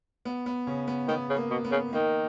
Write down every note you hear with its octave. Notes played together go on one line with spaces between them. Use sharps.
B3
B3
C#3 C#4
B3
D#3 B3
C#3
A#3
B2
B3
C#3
D#3 A#3